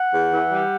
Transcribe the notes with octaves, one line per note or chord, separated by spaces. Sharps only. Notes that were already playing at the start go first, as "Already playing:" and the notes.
Already playing: F#5
E2
E3
G3